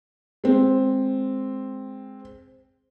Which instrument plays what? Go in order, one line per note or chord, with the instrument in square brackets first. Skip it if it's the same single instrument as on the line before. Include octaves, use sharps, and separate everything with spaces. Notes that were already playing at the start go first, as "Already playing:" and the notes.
[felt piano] G#3 C4